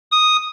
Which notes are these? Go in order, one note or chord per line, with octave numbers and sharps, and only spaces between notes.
D#6